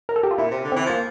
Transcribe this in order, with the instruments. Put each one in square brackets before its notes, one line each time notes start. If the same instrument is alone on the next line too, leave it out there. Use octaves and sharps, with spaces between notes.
[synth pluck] A#4
A4
G4
F4
[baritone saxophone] A#2 [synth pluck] E4
[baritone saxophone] C3
D3
[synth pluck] C4
[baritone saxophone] E3
[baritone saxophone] F3 [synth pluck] A#3